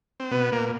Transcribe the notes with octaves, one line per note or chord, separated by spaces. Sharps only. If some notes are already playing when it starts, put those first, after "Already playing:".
C4
B2 B3
A#2 A#3